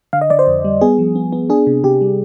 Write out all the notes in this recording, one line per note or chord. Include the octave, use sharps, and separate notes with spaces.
D3 F5
D#5
D3 D5
C5
F2
G3
B3 G#4
F3
B3
B3
D4 G#4
C3
C3 G4
G3